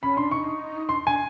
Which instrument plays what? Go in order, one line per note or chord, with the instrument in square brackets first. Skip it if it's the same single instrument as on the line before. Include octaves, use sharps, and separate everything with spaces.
[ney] C#4 [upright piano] B5
[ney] D4 [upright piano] C6
[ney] D#4 [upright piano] C#6
[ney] D4 [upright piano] C6
[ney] D4 [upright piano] G#5